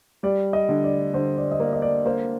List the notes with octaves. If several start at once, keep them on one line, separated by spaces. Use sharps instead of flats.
G3 D5
D#5
D3
D5
D3 C5
D5
D#5
A#3 D5
D#5
D5
A#3 C5